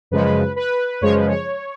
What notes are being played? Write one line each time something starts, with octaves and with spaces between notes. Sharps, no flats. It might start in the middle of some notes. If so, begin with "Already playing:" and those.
F#2 C#3 F3 G#3 B4
B4
F#2 C#3 F3 G#3 C#5
B4
C#5